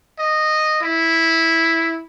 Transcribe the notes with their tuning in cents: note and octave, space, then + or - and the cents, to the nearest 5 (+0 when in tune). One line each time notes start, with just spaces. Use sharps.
D#5 -10
E4 -5